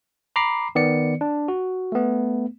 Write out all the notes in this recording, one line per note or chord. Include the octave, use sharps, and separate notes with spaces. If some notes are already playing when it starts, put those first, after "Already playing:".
A#5 B5 D6 C7
D#3 B3 D5 C#7
D4
F#4
A3 B3